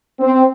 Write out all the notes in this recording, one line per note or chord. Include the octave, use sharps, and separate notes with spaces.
C4